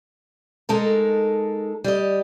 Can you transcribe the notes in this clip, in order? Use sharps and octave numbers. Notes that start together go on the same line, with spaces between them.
G#3 D#4 A4 A#4
G3 D#5